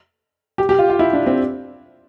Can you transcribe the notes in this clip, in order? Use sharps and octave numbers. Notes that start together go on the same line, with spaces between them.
G4
G4
F4
F4
E4
D4
C4